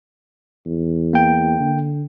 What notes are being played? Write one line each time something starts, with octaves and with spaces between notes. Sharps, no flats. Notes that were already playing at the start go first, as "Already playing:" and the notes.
E2
A#3 G5
D3